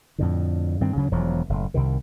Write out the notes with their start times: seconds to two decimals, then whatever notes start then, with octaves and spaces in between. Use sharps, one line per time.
0.18 F2 A2 D3
0.81 G2 D#3 C4
0.95 D2 C#3 F#3
1.12 E1 E2 F3 F#3
1.49 F#1 A2
1.74 C2 C3 D#3